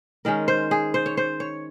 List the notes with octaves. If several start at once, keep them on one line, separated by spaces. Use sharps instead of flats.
D#3 G#3 C#4 A#4
C5
G#4
C5
C#5
C5
C#5